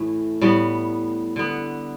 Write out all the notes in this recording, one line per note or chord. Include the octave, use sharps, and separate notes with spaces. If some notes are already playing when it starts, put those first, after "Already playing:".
Already playing: A2 E3 A3
A2 G3 B3
D3 B3